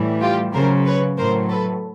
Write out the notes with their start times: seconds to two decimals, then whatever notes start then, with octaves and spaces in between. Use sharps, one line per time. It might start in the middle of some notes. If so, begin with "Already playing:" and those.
Already playing: A2 E3 G3
0.22 F4 G4
0.53 C#3 F#3 A#4 C5
0.85 B4 C#5
1.18 A2 F#3 A#4 C5
1.49 A4 B4